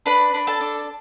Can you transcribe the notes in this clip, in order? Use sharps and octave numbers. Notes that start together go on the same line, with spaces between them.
D4 B4 B5
D4
A4 A5
D4